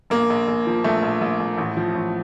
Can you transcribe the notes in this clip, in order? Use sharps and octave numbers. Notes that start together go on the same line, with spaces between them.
A#1 A#3
A#1
A#1
F3
A#1 A3
A#1
A#1
A#1
A1
F3
A1